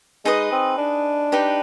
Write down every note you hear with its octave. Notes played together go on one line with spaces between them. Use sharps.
G#3 D#4 G#4 B4 D#5
C4
D4
D#4 G4 B4